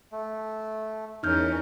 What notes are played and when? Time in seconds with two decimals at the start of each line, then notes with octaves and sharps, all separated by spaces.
0.12 A3
1.23 E2 C#4 D#4 A#4 F6 G6